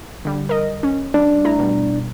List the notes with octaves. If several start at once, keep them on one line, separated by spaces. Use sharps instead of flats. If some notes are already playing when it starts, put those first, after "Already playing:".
D3 G3
A#4 D#5
C#4
G3 D4
A3 E4 A#5
B2 G3